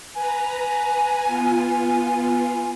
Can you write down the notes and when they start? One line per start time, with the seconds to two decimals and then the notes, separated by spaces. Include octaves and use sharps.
0.15 B4 G#5 A#5
1.24 B3 F4